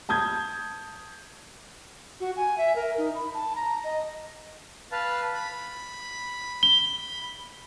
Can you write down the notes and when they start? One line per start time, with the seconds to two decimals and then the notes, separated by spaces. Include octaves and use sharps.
0.09 A5 D#6 G6 G#6
2.20 F#4
2.36 G#5
2.58 E5
2.76 A#4
2.98 D#4
3.15 B5
3.34 A5
3.56 A#5
3.84 D#5
4.92 B4 F5 A5
5.34 B5
6.63 G7